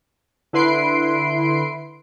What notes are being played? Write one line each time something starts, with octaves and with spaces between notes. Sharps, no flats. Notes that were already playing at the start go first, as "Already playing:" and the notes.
D3 E4 B4 C6 C7 D7